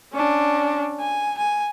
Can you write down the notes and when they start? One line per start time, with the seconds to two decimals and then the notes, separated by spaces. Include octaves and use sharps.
0.13 C#4 D4
1.00 G#5
1.37 G#5